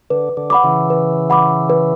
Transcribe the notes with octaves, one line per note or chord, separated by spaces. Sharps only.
D3 B4
D3
F#5 B5 D6
C#3 E3
B4
F#5 B5 D6
B4